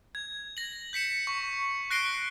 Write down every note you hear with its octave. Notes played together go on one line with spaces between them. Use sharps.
G#6
A#6 F#7
G6 B6 C#7 E7
C#6
F#6 A#6 C7 D7 G7